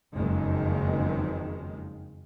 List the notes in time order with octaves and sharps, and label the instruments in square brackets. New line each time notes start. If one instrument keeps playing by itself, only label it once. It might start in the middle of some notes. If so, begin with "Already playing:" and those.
[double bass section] F#1 F2 D#3 G#3